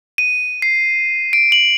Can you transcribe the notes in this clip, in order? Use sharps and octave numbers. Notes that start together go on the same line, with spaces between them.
D#7
C7
D7
F#7